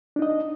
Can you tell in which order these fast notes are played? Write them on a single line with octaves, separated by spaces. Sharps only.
D4 D#4 D#5